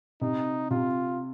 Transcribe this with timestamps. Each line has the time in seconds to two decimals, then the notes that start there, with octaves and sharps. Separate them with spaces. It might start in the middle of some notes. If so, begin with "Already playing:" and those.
0.21 C3 D#4
0.71 C3 F4